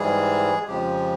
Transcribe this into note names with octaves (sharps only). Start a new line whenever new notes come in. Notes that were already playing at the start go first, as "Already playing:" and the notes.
Already playing: G#2 E3 G3 G#3 G#4
F2 C#3 F3 G#3 G4